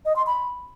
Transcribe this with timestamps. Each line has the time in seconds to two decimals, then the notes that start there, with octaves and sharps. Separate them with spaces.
0.05 D#5
0.16 C6
0.26 B5